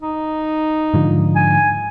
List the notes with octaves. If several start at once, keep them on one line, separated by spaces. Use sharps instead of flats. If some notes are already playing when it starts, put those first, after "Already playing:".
D#4
G#2 D3 F3
G#5